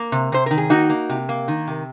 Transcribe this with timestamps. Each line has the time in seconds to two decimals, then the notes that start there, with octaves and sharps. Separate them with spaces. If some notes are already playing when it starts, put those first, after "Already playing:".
Already playing: A#3
0.12 C3
0.32 C3 C5
0.46 D#3 A#4
0.58 G#4
0.70 A#3 D#4 F#4
0.89 A#3
1.09 C3
1.29 A#3
1.48 D#3
1.67 C3